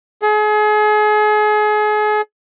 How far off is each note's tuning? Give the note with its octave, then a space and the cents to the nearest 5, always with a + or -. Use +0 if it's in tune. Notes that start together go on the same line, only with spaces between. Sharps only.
G#4 +35